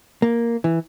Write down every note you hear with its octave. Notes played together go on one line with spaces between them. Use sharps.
A#3
E3